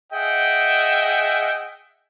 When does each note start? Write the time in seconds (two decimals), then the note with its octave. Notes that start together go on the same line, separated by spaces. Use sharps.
0.13 G#4 D#5 E5 F#5 G5